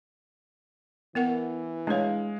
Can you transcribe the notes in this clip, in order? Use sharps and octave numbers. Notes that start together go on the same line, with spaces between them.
E3 B3 A#4 F#5
G#3 D4 C#5 F5